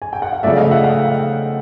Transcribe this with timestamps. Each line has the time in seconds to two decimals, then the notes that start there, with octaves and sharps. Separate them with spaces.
0.02 G#5
0.13 G5
0.22 F#5
0.32 F5
0.43 C#3 F3 A3 D5 E5
0.57 D#5 F5
0.70 E5 F#5
0.84 F5 G5
1.05 F5 G5